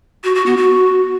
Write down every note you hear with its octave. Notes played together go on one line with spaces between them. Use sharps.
F#4
F#4
B3
F#4